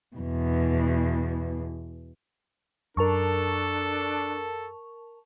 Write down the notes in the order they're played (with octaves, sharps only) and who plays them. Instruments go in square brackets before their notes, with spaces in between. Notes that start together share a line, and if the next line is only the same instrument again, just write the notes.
[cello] E2 B2
[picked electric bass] F#2 [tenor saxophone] D4 [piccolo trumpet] A4 [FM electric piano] A#4 A5 C#6